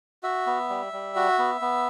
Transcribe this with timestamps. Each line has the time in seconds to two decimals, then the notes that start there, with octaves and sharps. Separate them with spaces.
0.23 F#4 E5
0.46 B3
0.69 G3
0.93 G3
1.16 F#4
1.39 B3
1.61 B3